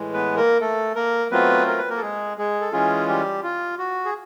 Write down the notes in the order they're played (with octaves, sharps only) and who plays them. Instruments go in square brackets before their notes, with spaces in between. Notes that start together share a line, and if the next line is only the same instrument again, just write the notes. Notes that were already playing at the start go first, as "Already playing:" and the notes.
Already playing: [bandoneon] A2 E3 G#3
B3 B4
A#3 A#4
A3 A4
A#3 A#4
F#3 A3 B3 C4 F4 B4
A#4
B4
A#3 A#4
A4
G#3 G#4
G#3 G#4
A4
E3 G#3 C#4 F4 G#4
G3 G4
F4
F#4
G#4